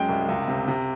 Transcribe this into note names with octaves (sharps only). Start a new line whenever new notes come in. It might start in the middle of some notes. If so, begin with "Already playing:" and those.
Already playing: F#2 G#3 G5
C2
C#2
C3
C3